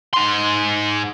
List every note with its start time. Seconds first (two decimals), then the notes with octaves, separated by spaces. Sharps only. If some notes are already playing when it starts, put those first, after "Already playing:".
0.14 G#2 C6